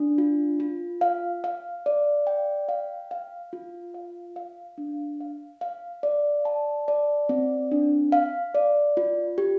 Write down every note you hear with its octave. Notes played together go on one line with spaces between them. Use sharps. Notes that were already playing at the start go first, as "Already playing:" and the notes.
Already playing: D4
F4
F4
F5
F5
D5
G5
F5
F5
F4
F5
F5
D4
F5
F5
D5
A5
D5
C4
D4
F5
D5
F4
G4